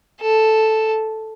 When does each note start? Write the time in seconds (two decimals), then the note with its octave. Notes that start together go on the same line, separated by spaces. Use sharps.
0.21 A4